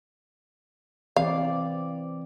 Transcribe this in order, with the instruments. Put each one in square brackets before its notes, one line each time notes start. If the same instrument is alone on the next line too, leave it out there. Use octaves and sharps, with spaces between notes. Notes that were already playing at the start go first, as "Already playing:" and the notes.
[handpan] E3 C4 D5 [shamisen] F5